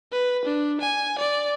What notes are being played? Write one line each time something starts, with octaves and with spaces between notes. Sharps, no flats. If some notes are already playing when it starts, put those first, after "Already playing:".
B4
D4
G#5
D5